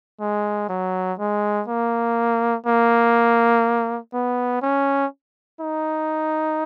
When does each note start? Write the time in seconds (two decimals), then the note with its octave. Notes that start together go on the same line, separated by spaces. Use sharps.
0.20 G#3
0.69 F#3
1.19 G#3
1.68 A#3
2.66 A#3
4.14 B3
4.62 C#4
5.61 D#4